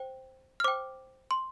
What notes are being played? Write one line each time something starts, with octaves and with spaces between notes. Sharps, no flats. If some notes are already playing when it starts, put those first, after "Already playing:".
Already playing: C5 G5
F6
C5 G5 D6
C6